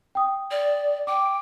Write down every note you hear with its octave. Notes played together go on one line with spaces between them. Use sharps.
G5 D#6
D5
G5 D6